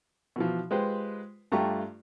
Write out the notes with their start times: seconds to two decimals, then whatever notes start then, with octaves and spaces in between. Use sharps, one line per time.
0.36 B2 E3 F3
0.71 G#3 F4 G4 B4 C5
1.52 G2 A3 F4 G4 A#5 C#6